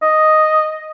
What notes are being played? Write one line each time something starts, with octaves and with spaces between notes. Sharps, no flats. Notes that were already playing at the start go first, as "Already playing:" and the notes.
D#5